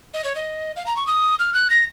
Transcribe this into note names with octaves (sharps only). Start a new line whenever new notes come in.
D#5
C#5
D#5
F5
A#5
C#6
D#6
F6
F#6
A#6